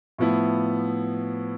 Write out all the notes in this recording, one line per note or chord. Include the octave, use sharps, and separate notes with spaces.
A2 F3 B3 E4